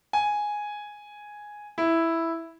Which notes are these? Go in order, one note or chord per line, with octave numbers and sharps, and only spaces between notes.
G#5
E4